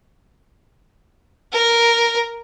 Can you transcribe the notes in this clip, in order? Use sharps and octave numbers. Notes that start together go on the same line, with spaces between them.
A#4